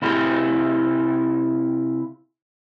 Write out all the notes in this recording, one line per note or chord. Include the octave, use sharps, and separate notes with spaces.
C3 E4 F4 G4 G#4